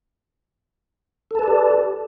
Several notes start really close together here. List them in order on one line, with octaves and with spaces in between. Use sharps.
A4 A5 B4 D5 G4